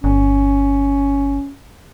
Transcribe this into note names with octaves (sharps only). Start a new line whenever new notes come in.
G1 C#4